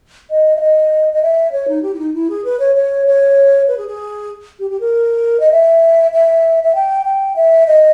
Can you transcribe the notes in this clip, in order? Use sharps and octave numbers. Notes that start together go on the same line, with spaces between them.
D#5
E5
D#5
D#5
E5
C#5
D#4
G4
E4
D#4
E4
G#4
B4
C#5
C#5
C#5
B4
G#4
G#4
G4
G4
A#4
D#5
E5
E5
E5
G5
G5
E5
D#5